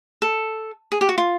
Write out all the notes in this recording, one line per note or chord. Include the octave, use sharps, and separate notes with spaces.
A4
G#4
G4
F#4
F4